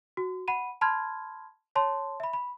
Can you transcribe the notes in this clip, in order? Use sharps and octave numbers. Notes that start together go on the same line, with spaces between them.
F#4
F#5 B5 D#7
A5 B5 C6 F6 G#6
C#5 A5 C6
E5 B5
B5